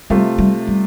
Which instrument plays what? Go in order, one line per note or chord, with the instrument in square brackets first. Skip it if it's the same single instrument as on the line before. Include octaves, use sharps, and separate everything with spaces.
[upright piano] C3 A3 F4 [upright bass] G3
[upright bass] G3
G3